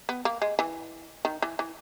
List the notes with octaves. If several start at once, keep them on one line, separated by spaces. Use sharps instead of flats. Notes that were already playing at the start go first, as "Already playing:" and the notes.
B3
A#3
G#3
E3
D#3
E3
E3